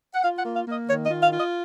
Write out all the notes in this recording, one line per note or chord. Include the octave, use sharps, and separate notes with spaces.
F#5
F4 F5
F#5
A#3
F5
A#3 D#5
D#3 C#5
D#5
F4
F5
F4
D#5